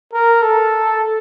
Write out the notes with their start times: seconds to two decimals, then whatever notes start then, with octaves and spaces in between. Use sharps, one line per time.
0.13 A#4
0.42 A4